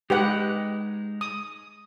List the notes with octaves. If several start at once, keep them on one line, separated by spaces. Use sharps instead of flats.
G#3 D#4 G4 B4 F#5
D#6